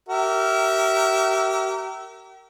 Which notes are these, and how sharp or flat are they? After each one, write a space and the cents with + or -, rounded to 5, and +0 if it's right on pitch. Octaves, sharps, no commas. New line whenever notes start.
G4 -40 A#4 -15 E5 +0